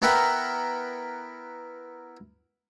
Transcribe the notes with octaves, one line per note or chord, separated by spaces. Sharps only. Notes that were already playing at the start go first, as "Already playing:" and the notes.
B3 E4 A#4 F#5 G5 B5